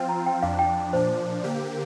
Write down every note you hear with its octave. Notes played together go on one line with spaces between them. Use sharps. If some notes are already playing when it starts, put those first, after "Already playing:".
Already playing: F3 C4 F4 G5
A#5
G5
F2 F3 D4 F5
G5
A#2 F3 D4 C5
D3 A#3 G4